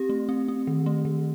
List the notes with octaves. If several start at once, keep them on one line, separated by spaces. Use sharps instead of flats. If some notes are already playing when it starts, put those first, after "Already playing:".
Already playing: C4 G4
A3
C4
C4
D#3
A3
D#3